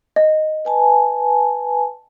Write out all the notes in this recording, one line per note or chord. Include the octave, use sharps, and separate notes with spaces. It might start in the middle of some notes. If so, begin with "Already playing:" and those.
D#5
B4 G#5 A5